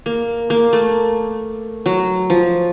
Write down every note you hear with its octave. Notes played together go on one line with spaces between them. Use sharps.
A#3
A#3
A3
F#3
F3